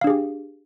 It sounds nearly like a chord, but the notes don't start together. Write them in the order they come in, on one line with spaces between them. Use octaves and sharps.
F5 D4 G#4 G4